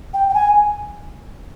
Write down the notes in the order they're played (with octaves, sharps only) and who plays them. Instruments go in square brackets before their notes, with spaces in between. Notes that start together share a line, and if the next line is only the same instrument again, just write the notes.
[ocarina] G5
G5
G#5